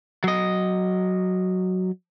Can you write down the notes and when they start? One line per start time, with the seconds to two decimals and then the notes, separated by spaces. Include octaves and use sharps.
0.24 F#3 D#5